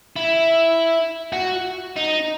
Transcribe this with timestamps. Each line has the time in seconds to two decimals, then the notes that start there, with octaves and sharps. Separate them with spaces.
0.16 E4
1.33 F#4
1.96 D#4